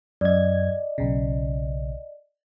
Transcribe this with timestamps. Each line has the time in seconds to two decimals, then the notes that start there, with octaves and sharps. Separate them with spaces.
0.21 F#2 D5 D#5 G#6
0.98 B1 C#3